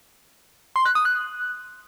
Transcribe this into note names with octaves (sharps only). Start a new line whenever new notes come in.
C6
F#6
D#6
F#6